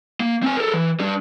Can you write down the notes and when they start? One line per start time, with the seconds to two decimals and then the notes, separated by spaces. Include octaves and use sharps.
0.20 A#3
0.43 C4 G#5
0.57 A4 A#4
0.73 E3
1.00 G3 D4